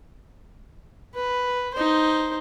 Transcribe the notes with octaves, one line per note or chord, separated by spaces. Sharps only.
B4
D#4 C5